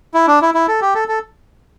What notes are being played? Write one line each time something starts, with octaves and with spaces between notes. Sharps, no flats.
E4
D4
E4
E4
A4
G4
A4
A4